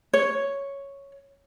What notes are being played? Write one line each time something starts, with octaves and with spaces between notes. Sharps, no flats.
C#5